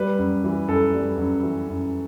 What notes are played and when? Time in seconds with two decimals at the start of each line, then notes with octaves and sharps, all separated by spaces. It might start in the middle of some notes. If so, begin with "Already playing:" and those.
Already playing: G3 B4
0.18 F#2
0.44 E3
0.68 F#2 A4
0.94 G3
1.18 F#2
1.43 E3
1.68 F#2